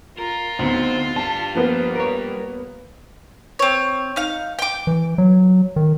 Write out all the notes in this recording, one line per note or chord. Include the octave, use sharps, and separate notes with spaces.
F4 A#4
D2 B3 C4 D#4
G3 D4 A5
F3 A#3 B3
A#4 C#5
C4 C#5
D#4 F5
G5 D6
E3
F#3
D#3